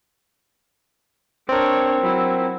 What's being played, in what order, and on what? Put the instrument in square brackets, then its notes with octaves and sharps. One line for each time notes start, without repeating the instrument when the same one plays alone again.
[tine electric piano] C4 A#4 [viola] D4 C#5
[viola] F#3 E4